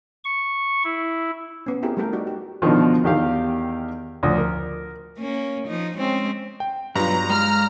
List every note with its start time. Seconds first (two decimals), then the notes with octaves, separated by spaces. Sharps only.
0.24 C#6
0.84 E4
1.66 B3 C#4
1.83 C4 E4 F4 G4 G#4 A#4
1.97 G3 A3 G4 A4 A#4 G5
2.13 D#4 F#4 D5
2.27 G4
2.62 B2 D3 D#3 F3
3.04 E2 D#3 G4 F5
4.23 D2 F3 D#6
4.38 A#4
5.18 A#3 C#4
5.68 F3 D#4
5.97 G#3 C4 C#4
6.60 G5
6.96 G2 F#3 F4 B4 A#5
7.30 G#3 F6